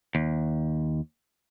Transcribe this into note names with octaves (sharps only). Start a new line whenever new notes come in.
D#2